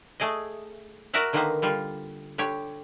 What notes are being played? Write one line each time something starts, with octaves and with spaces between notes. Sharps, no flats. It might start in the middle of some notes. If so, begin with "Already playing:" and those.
A3 G#4 D5 D#5
F#4 A#4 D5 E5 F#5
D3 D#3 A#3 B3 B4 C5
D3 G3 F4
D3 G4 C#5